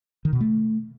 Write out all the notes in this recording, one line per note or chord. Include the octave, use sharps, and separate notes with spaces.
D#3
B2
A3